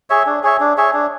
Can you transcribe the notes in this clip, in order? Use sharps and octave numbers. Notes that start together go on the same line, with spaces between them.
G#4 C#5 E5
D4
G#4 C#5 E5
D4
G#4 C#5 E5
D4